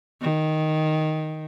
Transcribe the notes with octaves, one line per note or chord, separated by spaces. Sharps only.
D#3